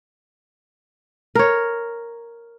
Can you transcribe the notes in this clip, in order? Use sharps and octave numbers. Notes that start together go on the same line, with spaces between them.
A#4 C#5